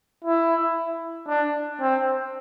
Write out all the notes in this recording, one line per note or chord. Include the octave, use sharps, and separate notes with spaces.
E4
D4
C4